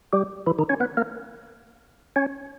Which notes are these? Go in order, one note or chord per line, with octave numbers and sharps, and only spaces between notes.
G3 G4
E3 E4
D#3 D#4
C#4 C#5
B3 B4
A#3 A#4
C#4 C#5